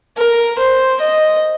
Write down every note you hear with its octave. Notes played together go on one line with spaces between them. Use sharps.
A#4
C5
D#5